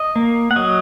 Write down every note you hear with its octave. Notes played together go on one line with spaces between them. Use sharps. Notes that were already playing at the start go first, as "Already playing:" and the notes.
Already playing: D#5
A#3
F#5
F#3 D#5